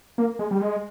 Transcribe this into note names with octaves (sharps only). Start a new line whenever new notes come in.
A#3
G#3
G3
G#3